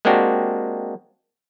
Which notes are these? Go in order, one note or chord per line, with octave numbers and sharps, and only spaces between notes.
G#3 A#3 C4 D4 F#4 G4